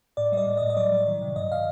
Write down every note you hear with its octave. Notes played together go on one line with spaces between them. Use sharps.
A2 D5
G3 D#5
D5
A2
D#5
A2
D#5
F#3 D5
F#3
D#3
C3
G2 D#5
F5